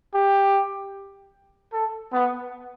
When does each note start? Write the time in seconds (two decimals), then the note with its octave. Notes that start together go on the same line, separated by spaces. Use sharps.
0.14 G4
1.73 A4
2.13 B3